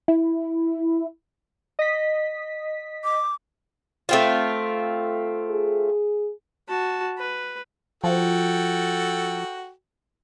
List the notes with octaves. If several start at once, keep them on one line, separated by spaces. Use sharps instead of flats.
E4
D#5 B6
D6
A3 C4 F4
G#4
F#4 A5
B4
F3 F#4 A4 G5